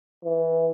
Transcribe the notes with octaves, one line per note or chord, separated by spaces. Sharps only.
E3